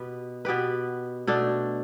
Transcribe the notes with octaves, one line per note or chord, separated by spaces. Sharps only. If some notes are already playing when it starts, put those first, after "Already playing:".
Already playing: B2 B3 G4 B4
B2 B3 G4 B4
B2 A3 D4